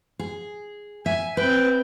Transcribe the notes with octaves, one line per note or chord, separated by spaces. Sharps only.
G#4
E5 G#5
C4 B4 G5